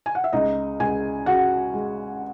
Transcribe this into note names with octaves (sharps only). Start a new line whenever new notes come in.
G#5
F#5
E5
C#2 D#4 D#5
C#2 G#4 G#5
C#3 F#4 F#5
G#3